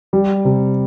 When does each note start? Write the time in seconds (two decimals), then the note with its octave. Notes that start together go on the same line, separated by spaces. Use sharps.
0.13 G3
0.45 C3